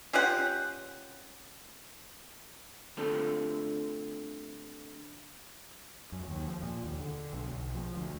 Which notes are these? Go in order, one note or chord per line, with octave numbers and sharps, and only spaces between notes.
C#4 F4 G4 F#5
D3 G3 A3 C4 F4 A4
F#2
D#2
F3
A#2
D#2
D3
B1
B1
F3
D2